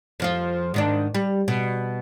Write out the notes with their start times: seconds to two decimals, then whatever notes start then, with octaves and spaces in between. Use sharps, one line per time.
0.20 F2 F3 F4
0.74 G#2 D#3 D4
1.14 G3
1.48 B2